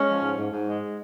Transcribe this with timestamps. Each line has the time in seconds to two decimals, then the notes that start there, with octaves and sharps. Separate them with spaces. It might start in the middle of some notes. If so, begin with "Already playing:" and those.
Already playing: G#3 C#4
0.09 F3
0.23 G#2
0.38 G#2
0.52 G#2
0.68 G#3